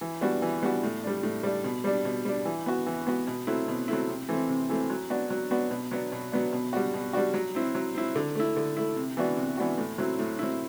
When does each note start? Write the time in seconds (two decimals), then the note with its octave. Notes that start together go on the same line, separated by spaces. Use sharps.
0.01 E3
0.21 G3 B3 D4 F#4
0.42 E3
0.62 G3 B3 D4 F#4
0.83 A2
1.03 G3 D4
1.23 A2
1.43 G3 D4
1.64 B2
1.84 G3 D4
2.05 B2
2.25 G3 D4
2.45 E3
2.66 B3 F#4
2.86 E3
3.07 B3 F#4
3.27 B2
3.47 F#3 A3 C4 E4
3.68 B2
3.88 F#3 A3 C4 E4
4.08 C3
4.29 E3 A3 C4
4.49 C3
4.70 E3 A3 C4
4.90 F#3
5.10 B3 D4 F#4
5.30 F#3
5.51 B3 D4 F#4
5.71 B2
5.91 F#3 B3 D4
6.12 B2
6.32 F#3 B3 D4
6.53 B2
6.73 G3 D4 F#4
6.93 B2
7.13 G3 D4 F#4
7.34 F#3
7.55 C4 E4
7.75 F#3
7.95 C4 E4
8.15 D3
8.35 A3 E4
8.56 D3
8.77 A3 E4
8.96 C3
9.17 E3 B3 D4 F#4
9.37 C3
9.57 E3 B3 D4 F#4
9.78 A2
9.98 F#3 C4 E4
10.19 A2
10.39 F#3 C4 E4